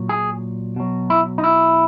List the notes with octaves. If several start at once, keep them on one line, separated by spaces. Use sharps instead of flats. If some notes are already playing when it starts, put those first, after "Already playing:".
Already playing: A#2 F#3
G#4
B2 F#3
E4
D#4
E4